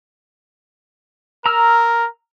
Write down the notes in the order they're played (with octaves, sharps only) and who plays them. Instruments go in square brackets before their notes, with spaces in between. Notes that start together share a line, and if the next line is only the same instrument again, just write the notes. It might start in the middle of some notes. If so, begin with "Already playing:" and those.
[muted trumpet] A#4 [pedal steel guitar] A#5 E6 F6